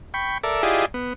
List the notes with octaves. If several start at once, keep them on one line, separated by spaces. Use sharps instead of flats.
G5 B5 C#6
A4 A#4 D5 E5
E4 F4 G4 G#4 D5 D#5
B3